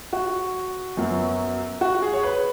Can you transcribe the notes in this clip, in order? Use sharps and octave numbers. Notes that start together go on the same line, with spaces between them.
F#4
F#2 F#3 B3
F#4
G#4
C#5
B4